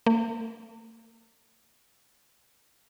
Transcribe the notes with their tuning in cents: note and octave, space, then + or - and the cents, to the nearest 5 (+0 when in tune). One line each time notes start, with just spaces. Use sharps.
A#3 -45